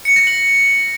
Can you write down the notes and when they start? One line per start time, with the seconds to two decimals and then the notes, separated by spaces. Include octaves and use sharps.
0.05 C#7
0.16 A#6
0.27 F#7